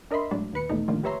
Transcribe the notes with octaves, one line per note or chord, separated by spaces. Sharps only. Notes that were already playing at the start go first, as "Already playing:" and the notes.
D4 A#4 D#5 E5 B5 C6
A2 F#3 G#3 D4
D#2 A#2 B4 C#7
A#1 E2 B2 A3 D#4
A2 D3 D#3 F3 A#3 F4
G4 B4 C#5 E5 A#5 C6